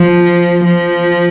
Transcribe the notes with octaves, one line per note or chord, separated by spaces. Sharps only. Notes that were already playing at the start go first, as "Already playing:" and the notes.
Already playing: F3
F3